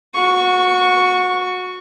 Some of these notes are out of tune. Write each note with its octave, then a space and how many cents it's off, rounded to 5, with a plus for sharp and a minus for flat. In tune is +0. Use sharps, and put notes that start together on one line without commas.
F#4 -25 C#6 +5